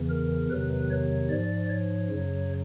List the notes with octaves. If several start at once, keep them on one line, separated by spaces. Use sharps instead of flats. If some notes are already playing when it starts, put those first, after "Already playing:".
Already playing: E2 C#3 E3
A#4
E2 C3 D#3 F#3 B4
C#5
G#2 F3 D5
C#5
F#2 C#3 F#3